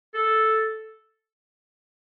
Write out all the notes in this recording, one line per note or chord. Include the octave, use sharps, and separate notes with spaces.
A4